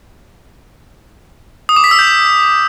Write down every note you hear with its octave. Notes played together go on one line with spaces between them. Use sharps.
D#6
D6
B6
E6
G6